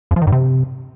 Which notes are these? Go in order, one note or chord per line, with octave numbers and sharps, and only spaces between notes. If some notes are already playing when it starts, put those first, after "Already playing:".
F2
F3
D#3
G2
C3